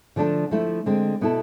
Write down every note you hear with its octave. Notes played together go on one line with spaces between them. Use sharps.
D3 F3 A3 D4 A4
F3 A3 E4
D3 G#3 C4
B2 B3 E4 A4